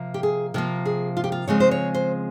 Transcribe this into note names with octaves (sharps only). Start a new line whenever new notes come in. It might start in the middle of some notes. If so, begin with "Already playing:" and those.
Already playing: C3 F3 A#3
G4
G#4
C3 F3 A#3 A#4
G#4
F4
G4
F4
C#3 F3 G#3 C4 C#5
C5
C#5
C5